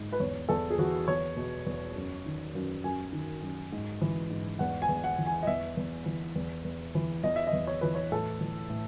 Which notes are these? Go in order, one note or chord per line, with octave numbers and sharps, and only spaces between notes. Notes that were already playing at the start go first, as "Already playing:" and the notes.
Already playing: G#2
B4
E2 C#5
E2 A4
G#4
E3 F#4
E2 C#5
B2
E2
F#2
D#3
F#2
F#2 G#5
D#3
F#2
G#2
E3
G#2
E2 F#5
G#5
E2
F#5
E3
G#5
D#5
E2 E5
E2
E3
E2
E2
E3
E2 D#5
E5
D#5
E2
C#5
E3 B4
C#5
A2 A4
E3
A2